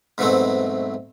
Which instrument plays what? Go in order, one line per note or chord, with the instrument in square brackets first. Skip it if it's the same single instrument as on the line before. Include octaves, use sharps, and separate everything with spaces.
[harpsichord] G#2 B2 E3 F#3 A3 C4